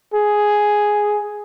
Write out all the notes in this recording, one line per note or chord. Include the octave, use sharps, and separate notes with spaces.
G#4